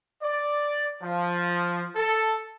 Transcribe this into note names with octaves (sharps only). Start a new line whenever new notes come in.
D5
F3
A4